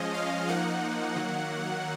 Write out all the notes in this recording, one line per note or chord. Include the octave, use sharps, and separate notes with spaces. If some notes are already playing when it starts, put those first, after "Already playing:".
Already playing: F3 G#3 C#4 D#5
F5
F3 A#3 D#4 F#5
D#3 F#3 A#3